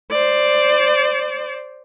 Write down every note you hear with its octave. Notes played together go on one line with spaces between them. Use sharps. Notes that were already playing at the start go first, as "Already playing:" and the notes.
C5 D5